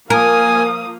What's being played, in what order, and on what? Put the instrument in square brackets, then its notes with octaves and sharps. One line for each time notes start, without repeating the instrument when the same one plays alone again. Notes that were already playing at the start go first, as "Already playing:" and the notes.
[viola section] F3 A#3 [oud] A#4 [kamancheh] F5 D#6 [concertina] G#5